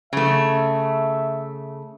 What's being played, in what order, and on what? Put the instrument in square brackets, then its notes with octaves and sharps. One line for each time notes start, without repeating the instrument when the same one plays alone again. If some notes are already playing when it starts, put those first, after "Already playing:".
[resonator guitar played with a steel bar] C#3 A3 [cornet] E5